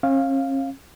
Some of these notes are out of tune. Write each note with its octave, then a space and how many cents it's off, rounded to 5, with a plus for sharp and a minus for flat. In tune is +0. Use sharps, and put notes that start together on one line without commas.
C#4 -40 F5 +0